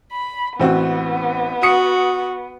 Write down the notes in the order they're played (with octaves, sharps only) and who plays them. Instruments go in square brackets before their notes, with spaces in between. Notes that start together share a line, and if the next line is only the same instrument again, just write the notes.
[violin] B5
[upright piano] A1 C4 F#4 [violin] B3
[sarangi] F#4 [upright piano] D#6 C#7